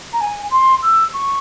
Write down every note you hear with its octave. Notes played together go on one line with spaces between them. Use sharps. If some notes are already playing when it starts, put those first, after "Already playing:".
A#5
G#5
C6
E6
C#6